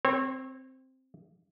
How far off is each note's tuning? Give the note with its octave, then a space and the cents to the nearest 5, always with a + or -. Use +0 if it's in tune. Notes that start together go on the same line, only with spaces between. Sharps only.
C4 +0 C#5 -35